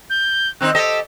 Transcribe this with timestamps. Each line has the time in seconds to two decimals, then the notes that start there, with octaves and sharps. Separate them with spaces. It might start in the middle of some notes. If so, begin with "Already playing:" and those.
0.10 G6
0.61 D#3 C4 D#4 F#6
0.75 G4 A4 D#5 E6